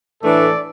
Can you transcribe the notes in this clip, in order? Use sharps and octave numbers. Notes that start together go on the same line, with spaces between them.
A2 E3 A3 D4 A4 D5